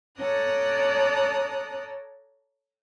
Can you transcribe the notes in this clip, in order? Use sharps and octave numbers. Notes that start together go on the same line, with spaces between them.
A4 C#5 D5 A#5 D#6 F#6